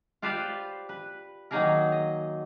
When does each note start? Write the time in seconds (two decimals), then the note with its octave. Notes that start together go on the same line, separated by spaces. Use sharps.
0.22 F4 G4 B4 C5 D5 F5
0.89 B4
1.51 D#3 F#3 A#3 D#4 G#4 A#4
1.92 D#5